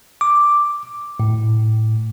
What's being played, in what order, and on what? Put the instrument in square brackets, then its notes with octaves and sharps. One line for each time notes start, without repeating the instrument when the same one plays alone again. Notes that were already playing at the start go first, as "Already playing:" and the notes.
[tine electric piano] D6
A2